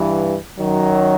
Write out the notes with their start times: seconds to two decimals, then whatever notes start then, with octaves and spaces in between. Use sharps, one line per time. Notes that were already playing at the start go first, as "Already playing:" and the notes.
Already playing: G2 E3
0.58 F#2 D#3 F#3